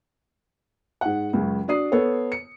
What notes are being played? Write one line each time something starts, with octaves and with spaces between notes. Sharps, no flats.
G#2 F#5
C#2 F#2 C#3
D4 F#4 D5 D#6 C7
B3 A4 C#5
C#7